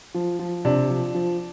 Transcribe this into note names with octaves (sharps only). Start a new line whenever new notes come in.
F3
F3
C3 D4
F3
F3